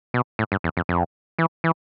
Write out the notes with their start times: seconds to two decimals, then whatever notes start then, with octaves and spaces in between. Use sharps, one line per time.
0.14 B2
0.39 A2
0.52 G2
0.64 E2
0.77 F2
0.89 F2
1.39 E3
1.64 E3